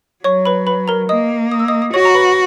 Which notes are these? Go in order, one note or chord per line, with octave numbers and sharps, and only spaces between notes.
F#3 C#5 C#6
B4 B5
B4 B5
A#4 A#5
A#3 D#5 D#6
D#6
E6
D#5 D#6
D#6
F#4 C#5 C#6
A#5
B4 B5